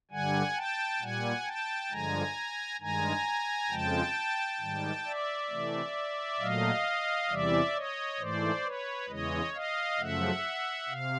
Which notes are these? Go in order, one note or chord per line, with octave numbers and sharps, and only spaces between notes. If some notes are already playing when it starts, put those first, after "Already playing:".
G2 D3 G3 F#5 G#5
G5 A5
A#2 G3 F#5 G#5
G5 A5
G2 D3 F3 G#3 G#5 A#5
G2 D#3 G#3 G#5 A#5
F2 C#3 F3 G#3 G5 A5
G#2 D#3 G3
D5 E5
C3 E3 A3
A#2 F#3 A3 D#5 F5
E2 C3 E3 G3 D5 E5
C#5 D#5
G#2 E3 A3 C5 D5
B4 C#5
E2 C#3 E3 G#3 C#5 D#5
D#5 F5
F#2 C#3 F3 A3 E5 F#5
C3 F5